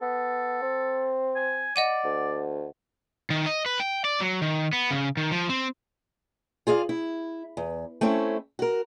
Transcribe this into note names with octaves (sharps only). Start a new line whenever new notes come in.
B3 A4
C4
G#5
D5 D#5 F#5 D#7
D2
D#3
D#5
B4
G5
D5
F#3
D#3
B3
C#3
D#3
F3
C4
F4 G#4 D5 F5
E4
E2
A3 C4 C#4 E4
F#4 A#4